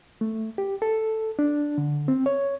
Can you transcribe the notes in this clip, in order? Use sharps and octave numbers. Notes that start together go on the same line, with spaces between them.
A3
G4
A4
D4
D3
C4
C#5